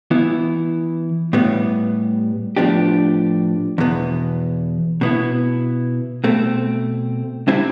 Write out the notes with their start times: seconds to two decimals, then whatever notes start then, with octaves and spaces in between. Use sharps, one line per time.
0.11 E3 B3 E4
1.33 A2 G3 B3
2.57 A2 F3 B3 D4 G4
3.78 E2 B2 B3
5.01 B2 B3 E4
6.24 B2 A3 C4
7.48 C3 G3 C4 E4